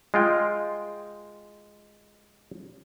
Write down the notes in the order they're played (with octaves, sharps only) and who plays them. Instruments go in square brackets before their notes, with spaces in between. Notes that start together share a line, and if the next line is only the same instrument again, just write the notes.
[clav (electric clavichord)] G#3 F4 G5